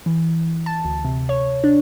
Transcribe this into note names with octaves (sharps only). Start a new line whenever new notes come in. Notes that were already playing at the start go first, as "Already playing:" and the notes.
E3
A5
D2
C3
C#5
D4